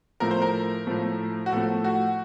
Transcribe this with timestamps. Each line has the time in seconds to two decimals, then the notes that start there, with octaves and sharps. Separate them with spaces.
0.20 A2 F3 A3 A#4
0.31 C5
0.42 A#4
0.87 A2 F3 A3
1.46 F#4
1.52 A2 F3 A3 A4
1.84 F#4